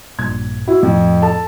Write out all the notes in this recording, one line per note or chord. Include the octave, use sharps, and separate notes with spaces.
A#1 G2 A#2 G#6
E4 F#4
F2 A2
A4 A5